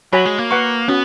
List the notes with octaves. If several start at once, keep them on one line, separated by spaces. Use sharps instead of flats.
F#3 F#4 C#5 G#5 B5
G#3
A#3
B4 F#5 C#6
B3 C#4 F#4